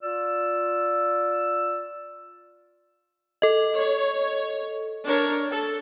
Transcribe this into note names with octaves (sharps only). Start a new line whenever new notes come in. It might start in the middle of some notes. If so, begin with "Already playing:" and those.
F4 D5 E6
A4 D#5
C#5
D4 A#4 C#5
A4